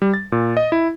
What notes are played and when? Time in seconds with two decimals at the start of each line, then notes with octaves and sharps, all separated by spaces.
0.02 G3
0.14 A6
0.32 A#2
0.57 D#5
0.72 E4